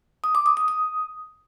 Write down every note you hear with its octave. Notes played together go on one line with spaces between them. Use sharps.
D#6
D6
D#6
D#6
D#6